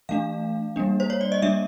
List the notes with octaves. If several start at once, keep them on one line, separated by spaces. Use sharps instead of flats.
E3 A3 D4 F5
G3 A#3 D4
C5
C#5
D5
D#5
G3 A#3 D4 E5